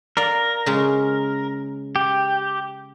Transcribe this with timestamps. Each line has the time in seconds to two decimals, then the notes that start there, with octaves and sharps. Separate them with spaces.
0.17 A#4 D5 F5
0.66 C#3 G#3
1.96 G4